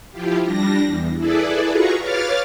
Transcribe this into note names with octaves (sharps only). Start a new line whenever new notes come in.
F3 E4 F4 G4
G3 D4 A#6
E2
E4 G#4 A4 B4 D5
F4 F#4 G#4 B4 A#5 C#6
B4 C#5 F5 D6 F6 A6